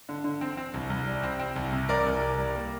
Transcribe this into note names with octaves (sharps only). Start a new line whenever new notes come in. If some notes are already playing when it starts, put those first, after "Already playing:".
D3
D3
C4
C4
C2
C2
G3
C4
C4
C2
C3
G3 A#4 D5
C2
C2
G3
A#3